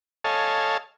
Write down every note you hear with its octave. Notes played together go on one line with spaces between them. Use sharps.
A4 C#5 D#5 F5 G#5 A5